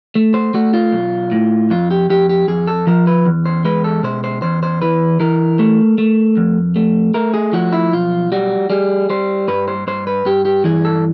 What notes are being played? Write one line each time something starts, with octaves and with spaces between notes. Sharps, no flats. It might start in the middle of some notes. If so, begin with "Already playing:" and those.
A3
C5
A3 F#4
F4
B1
A2
F2 F4
G4
F2 G4
G4
F2 G#4
A4
F3 A#4
B4
E2
C5
G#3 B4
A4
B2 C5
C5
E2 C5
C5
E3 B4
E3 A#4
A3
A3
F2
A3
A3 A#4
G#4
F3 F#4
E4
B1 F4
G3 F#4
G3 G#4
G3 C5
G2 B4
C5
G2 C5
B4
G2 G4
G4
E3 G#4
A4